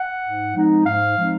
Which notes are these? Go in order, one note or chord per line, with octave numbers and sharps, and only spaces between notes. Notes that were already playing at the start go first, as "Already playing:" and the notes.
Already playing: F#5
G#2
F3 G#3 C4 D#4
G#2 F5
F3 G#3 C4 D#4